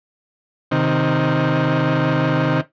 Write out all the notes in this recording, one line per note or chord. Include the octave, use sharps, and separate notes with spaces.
C3 D#3